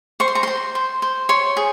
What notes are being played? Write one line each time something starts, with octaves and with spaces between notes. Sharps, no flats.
C5 C#6
C6
A#5
C5 C6
C5
C5
C#5 C6
G#4